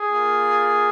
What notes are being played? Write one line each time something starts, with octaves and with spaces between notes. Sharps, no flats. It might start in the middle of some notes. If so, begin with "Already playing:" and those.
Already playing: G#4
A#3 F4